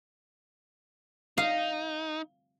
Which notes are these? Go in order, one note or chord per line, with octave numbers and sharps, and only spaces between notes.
D#4 F5